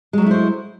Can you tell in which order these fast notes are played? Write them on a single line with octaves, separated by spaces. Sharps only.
G#3 F#3 A3 E4 C5